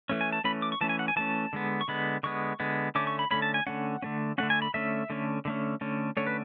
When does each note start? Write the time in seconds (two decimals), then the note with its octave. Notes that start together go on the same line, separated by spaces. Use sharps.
0.09 E3 A3 C#4
0.21 G#5
0.33 A5
0.44 E3 A3 C#4 B5
0.62 D6
0.72 C#6
0.81 E3 A3 C#4 A5
0.89 G#5
0.99 F#5
1.08 G#5
1.16 E3 A3 C#4 A5
1.53 D3 G#3 B3
1.81 C#6
1.88 D3 G#3 B3 B5
2.23 D3 G#3 B3 C#6
2.60 D3 G#3 B3
2.95 D3 A3 C#4 D6
3.07 C#6
3.19 B5
3.31 D3 A3 C#4 B5
3.42 A5
3.54 G#5
3.67 D3 A3 C#4 F#5
4.02 D3 A3 C#4
4.38 D3 A3 C#4 F#5
4.50 G#5
4.62 B5
4.74 D3 A3 C#4 E5
5.10 D3 A3 C#4
5.45 D3 A3 C#4
5.81 D3 A3 C#4
6.17 D3 A3 C#4 C#5
6.27 B4